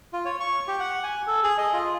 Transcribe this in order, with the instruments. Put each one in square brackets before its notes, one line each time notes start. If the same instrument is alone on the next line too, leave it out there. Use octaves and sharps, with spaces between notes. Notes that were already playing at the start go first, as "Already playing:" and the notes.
[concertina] F4
C#5
C#6
G4
F#5
G#5
A4
G#4
D#5
F4